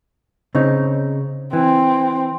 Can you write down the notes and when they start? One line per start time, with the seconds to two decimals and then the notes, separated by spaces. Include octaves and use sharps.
0.55 C#3 C4 D#4
1.53 E3 C4